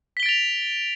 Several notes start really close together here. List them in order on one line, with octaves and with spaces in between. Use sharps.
B6 G7 D7 A6 F7